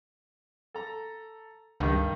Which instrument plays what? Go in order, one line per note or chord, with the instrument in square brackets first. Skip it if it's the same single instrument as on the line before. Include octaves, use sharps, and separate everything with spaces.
[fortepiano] A4 A#5
[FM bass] C#2 [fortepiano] G2 D#3 G3